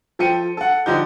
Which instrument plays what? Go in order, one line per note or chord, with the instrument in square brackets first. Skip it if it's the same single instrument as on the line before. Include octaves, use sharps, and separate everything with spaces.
[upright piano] F3 A4 G5 C#7 D#7
A4 F#5
D3 F3 D#4 G4 G6